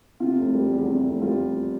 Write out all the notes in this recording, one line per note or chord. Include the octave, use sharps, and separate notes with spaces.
C3 F4
F1
G3
E2
C3
F1
G3 F4